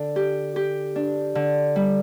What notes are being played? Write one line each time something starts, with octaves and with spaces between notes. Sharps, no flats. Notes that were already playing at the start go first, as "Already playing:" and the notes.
Already playing: D3 D4
G4
G4
D4
D3
G3